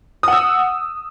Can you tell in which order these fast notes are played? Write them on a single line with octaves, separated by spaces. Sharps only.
D#6 F#5 E6